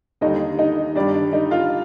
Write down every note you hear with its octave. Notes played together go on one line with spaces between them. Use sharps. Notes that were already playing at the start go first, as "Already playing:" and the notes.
D#2 D3 G3 D#4 D#5
D#4 D#5
G2 D#3 G3 D4 D5
D4 D5
D#4 D#5
F4 F5